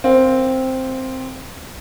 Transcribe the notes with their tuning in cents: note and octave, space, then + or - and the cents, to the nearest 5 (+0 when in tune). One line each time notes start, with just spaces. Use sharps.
C4 +0 A#4 +0 F5 +20